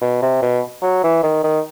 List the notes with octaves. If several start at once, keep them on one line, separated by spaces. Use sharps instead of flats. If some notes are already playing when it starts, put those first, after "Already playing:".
B2
C3
B2
F#3
E3
D#3
D#3